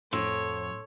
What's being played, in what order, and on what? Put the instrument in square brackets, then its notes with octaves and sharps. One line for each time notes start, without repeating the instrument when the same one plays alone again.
[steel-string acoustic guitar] F2 [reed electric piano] A2 C6 E6 [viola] C#5